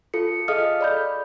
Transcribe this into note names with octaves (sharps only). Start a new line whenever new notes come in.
F4 A4 C#7
G#4 A4 D#5 F5 D#6 F6
D5 B5 G6